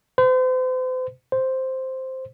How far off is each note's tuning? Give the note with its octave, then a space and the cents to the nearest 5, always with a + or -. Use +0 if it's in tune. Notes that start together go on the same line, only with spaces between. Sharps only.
C5 -40
C5 +0